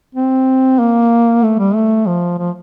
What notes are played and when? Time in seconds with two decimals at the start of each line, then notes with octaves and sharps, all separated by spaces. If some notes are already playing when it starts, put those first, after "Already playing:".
0.15 C4
0.79 A#3
1.43 A3
1.59 G3
1.74 A3
2.06 F3
2.39 F3